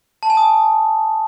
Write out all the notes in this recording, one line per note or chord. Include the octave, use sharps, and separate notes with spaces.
A5
G#5
D#6